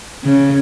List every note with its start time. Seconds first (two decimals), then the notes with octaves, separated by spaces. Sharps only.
0.24 C#3